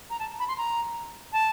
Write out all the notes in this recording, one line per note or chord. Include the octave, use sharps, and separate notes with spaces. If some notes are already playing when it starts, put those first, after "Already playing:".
A#5
A5
B5
C6
A#5
A5